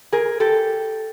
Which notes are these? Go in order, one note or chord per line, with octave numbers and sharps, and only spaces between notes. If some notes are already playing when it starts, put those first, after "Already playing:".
G#4 A#4
G4 A4